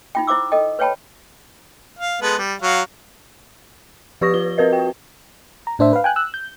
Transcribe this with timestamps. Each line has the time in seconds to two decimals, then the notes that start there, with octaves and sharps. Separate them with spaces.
0.15 D#4 F4 G5
0.27 E4 C5 F5 D6 E6
0.52 A4 D#5 G5
0.79 B4 C#5 F5 G5 A5 B5
1.99 F5
2.22 G#3 B3 A4
2.38 G3
2.62 F#3 F#4 F5
4.21 F3 G4 B4 C#6 D#6 A#6
4.34 F4 G7
4.58 C4 F#4 A#4 B4 D#5
4.73 G5
5.67 A#5
5.79 A2 D4 C5 E5
5.93 B4 F5
6.04 G5 G#5 F#6
6.16 E6 F#6
6.34 G6